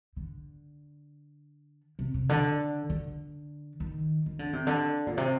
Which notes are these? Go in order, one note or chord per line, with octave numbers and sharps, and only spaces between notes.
D3
C3
C3
D3
D3
D#3
D#3
D3
C3
D3
A#2
C3